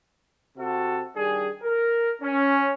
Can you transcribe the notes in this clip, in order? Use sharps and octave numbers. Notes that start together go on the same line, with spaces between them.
C3 F#4 A4
D#3 G3 D4 G#4
A#4
C#4